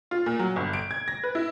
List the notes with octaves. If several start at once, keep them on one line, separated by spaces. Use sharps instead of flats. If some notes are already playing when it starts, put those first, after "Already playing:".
F4
A#2
F#3
G1
D7
G#6
A#6
B4
E4